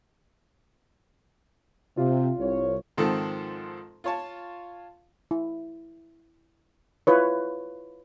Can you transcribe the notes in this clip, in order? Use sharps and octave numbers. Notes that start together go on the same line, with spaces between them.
C3 F4
C2 C#5
G#2 D#3 F3 C4 A4
F4 C#5 A5
E4
E4 F4 B4 C#5